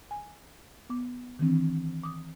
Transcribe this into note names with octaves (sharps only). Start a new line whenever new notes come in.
G#5
B3 D6
D#3 E3 C4 D4
D6 D#6